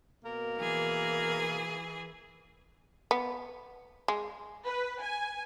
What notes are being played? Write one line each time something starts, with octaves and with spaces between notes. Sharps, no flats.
B2 A#3 A#4
E3 G#4
B3
G#3
B4
G#5